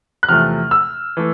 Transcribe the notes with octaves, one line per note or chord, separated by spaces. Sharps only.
F#6
E2 C3 F3 A3 F6
E6
E3 A3